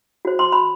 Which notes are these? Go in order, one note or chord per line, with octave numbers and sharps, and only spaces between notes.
F#4 C5
C6
B5